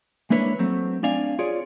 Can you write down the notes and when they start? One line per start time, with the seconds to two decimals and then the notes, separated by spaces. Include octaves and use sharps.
0.30 G#3 A#3 D4 E4 B4 C#5
0.59 F#3 A3 C4
1.03 C4 D4 D5 F5 G#5
1.39 F4 G#4 C#5 D5